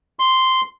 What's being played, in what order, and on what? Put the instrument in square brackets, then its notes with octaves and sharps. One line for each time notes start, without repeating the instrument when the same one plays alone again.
[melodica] C6